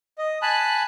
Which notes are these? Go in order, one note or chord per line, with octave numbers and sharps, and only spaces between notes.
D#5
G#5 A5 B5 F#6